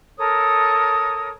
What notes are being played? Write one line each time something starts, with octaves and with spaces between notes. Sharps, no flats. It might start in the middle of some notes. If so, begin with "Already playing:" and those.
A4 A#4 C#5 D#6